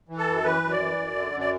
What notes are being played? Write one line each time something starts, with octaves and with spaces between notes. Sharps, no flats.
E3
A4
F#2
E3 B4
F#2
D5
E3
F#2
D3
F#2
D5